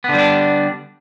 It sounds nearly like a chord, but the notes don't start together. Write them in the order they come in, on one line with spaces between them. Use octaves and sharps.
B3 D3 G3 D4